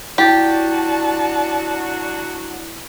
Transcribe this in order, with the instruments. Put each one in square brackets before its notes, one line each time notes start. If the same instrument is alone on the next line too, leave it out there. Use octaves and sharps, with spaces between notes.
[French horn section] F#3 D4 F#4 [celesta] E4 A6 [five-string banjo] G4 [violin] D5 A5